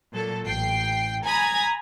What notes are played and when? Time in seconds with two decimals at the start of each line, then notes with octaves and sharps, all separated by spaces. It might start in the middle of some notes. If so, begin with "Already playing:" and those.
0.12 A#2 F#3 A4
0.44 A1 G5 C7
1.25 G#5 A#5 B5 D#6 G#6